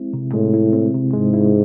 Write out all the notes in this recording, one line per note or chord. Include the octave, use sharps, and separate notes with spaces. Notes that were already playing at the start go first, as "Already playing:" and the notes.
Already playing: G#3 C4 E4
C3
A2 G#3
E4
C4
C3
G#2 G#3
E4